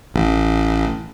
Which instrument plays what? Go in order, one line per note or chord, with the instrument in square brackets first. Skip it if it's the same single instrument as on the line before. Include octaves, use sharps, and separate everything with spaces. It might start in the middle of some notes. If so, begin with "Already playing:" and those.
[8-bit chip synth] A1